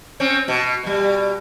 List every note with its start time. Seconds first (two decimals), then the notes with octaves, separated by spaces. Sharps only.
0.20 C4 C#4
0.48 B2
0.83 B2 G3